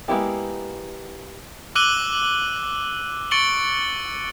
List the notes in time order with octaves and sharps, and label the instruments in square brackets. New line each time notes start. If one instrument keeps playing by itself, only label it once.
[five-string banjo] G#3 A#3 B3 E4 G4
[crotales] D6 E6 F#6 D#7 F#7 G7
C#6 A6 C#7 D7 F#7 G7